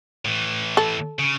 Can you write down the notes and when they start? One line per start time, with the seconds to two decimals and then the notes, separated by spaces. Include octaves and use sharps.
0.25 A2 E3
0.77 A4
1.19 C#3